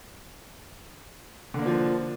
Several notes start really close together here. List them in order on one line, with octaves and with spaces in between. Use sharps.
D3 A#3 D4 F3